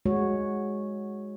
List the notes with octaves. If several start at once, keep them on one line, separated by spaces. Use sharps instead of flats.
G#3 F#4 C#5